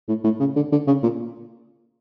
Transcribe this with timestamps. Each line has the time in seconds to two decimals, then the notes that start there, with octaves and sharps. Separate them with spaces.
0.08 A2
0.24 A2
0.40 C#3
0.56 D3
0.72 D3
0.87 C#3
1.03 A#2